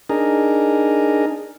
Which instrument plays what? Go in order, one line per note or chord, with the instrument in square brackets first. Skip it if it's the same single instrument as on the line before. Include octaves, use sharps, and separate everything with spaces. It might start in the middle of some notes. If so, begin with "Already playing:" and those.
[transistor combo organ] D4 D#4 G#4 A#4